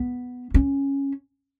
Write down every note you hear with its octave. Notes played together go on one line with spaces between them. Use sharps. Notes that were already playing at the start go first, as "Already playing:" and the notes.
Already playing: B3
C#4